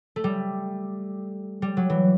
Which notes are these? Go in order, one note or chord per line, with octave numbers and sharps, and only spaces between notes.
A3
G3
G3
F#3
E3